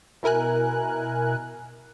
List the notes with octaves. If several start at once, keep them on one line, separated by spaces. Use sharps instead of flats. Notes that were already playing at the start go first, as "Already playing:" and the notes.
B2 E4 A#4 G#5 F#6